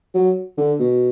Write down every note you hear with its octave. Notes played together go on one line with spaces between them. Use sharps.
F#3
D3
B2